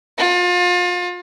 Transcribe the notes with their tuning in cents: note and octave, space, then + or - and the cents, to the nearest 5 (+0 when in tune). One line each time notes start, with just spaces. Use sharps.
F4 +30